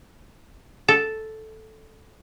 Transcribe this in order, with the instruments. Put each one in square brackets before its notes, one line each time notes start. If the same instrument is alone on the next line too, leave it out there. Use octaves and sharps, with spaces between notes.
[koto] A4